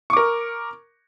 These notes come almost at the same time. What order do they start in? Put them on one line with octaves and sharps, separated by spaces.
C#6 D6 A#4